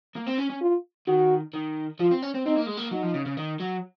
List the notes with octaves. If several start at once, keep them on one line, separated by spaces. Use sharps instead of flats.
A#3
C4
C#4
C#4
F4
D#3 F#4
D#3
F3 F4
C4
C#4
C4
C4 D#4
A#3
G#3
A#3
F#3 D#4
F3
C#3
C#3
D#3
F#3